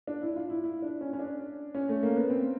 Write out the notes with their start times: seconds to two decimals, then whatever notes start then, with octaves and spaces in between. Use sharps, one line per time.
0.07 D4
0.22 E4
0.36 F4
0.50 E4
0.64 E4
0.82 D4
1.01 C#4
1.13 C#4
1.19 D4
1.75 C#4
1.89 A3
2.03 A#3
2.16 B3
2.30 C4